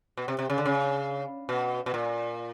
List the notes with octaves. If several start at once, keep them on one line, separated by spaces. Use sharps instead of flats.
B2
C3
C3
C#3
D3
C#3
B2
B2
A#2